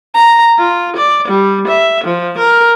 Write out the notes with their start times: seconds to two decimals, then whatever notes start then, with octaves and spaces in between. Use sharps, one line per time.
0.14 A#5
0.58 F4
0.96 D5
1.28 G3
1.67 E5
2.03 F3
2.37 A#4